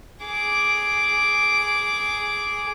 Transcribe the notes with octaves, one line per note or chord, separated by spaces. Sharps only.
G#4 D6